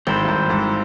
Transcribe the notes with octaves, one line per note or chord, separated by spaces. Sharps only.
G#1 G#2 C4 E4 A4 C5
G2
G#1 G#2
G#1 G#2